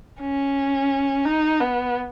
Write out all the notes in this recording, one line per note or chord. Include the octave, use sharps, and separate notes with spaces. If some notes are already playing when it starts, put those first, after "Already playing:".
C#4
D#4
B3